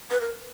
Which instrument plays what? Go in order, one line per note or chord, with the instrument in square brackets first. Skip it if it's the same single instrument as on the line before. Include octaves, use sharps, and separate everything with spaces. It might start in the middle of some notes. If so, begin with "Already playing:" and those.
[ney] B4
A#4